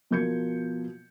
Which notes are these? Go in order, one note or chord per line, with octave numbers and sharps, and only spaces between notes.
B2 F3 A#4 G6 G#6 C#7